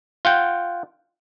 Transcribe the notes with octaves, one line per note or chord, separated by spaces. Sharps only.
F4 F#5 G5